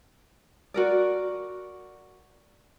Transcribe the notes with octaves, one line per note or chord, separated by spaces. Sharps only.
F#4 A#4 D5